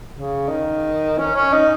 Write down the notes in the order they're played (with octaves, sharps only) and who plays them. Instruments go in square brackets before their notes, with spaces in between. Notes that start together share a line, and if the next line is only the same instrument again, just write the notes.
[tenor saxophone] C#3
D#3
C#4
C#4
D#4